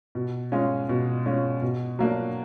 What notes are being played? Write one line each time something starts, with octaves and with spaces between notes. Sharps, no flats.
B2
G#3 C#4 F4
B2
G#3 C#4 F4
B2
F#3 A#3 D4